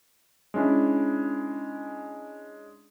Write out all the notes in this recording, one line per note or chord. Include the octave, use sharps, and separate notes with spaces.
G#3 C#4 D4 E4